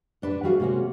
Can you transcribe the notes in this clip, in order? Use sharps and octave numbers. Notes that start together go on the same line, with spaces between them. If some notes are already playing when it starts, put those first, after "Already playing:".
G2 D4 B4
G3 A3 F#4 G#4 A#4 F5
C3 G#3 A#3 C#4 F#4